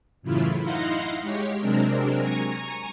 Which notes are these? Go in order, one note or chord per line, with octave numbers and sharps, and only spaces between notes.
F#2 A2 C#3 E3 E4 F4
D#4 E4 F5 F#5 C6 A#6
G#3 G4 C#5
C3 F#3 G#3 C4 D4 A#4
G#5 A#5 C#6